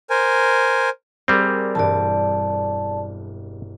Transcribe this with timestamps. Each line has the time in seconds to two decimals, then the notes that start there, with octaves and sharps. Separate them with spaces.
0.10 A#4 C5 G#5
1.28 G3 C4 G#4 A#4 D5
1.75 E1 G2 D5 A5